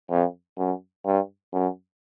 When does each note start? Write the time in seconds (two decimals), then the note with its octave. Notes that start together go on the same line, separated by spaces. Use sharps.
0.10 F2
0.57 F#2
1.05 G2
1.53 F#2